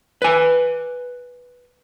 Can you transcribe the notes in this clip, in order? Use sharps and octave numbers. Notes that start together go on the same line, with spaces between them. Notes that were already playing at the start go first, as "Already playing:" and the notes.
B4 G#5